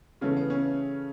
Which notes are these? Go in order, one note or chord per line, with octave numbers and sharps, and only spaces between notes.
C#3 E3 A3 C#4
B3
C#4